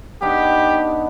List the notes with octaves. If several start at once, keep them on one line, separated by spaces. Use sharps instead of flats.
B3 D4 D#4 G4